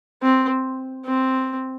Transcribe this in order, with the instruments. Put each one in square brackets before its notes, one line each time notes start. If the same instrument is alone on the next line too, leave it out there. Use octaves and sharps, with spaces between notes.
[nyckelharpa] C4
C4